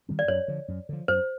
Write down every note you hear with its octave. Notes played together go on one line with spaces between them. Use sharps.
D#3 G3 C4
D5
F#2 C#5
D3 F3
F#2
D3 F3
F#2 C5